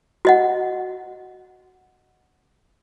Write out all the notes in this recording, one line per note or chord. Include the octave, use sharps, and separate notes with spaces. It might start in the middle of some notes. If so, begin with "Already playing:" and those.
F#4 D#5 F#5